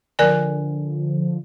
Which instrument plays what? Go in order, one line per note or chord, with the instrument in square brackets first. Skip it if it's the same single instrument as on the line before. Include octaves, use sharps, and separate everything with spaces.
[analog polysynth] D3 F3 [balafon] A#4 D5 G#5